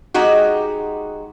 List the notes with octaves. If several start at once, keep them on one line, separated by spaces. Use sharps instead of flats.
G#3 D#4 F#4 G4